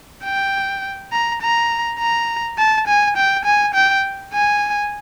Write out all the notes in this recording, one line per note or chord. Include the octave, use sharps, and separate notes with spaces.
G5
A#5
A#5
A#5
A5
G#5
G5
G#5
G5
G#5